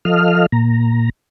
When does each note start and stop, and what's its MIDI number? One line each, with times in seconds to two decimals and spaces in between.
0.05 0.46 53
0.05 0.46 69
0.05 0.46 75
0.05 0.46 77
0.05 0.46 89
0.52 1.09 46
0.52 1.09 82